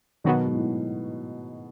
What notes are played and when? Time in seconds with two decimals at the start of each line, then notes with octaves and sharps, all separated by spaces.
0.24 B2 D#3 F#3 B3 F#4
0.46 G#2
0.55 A2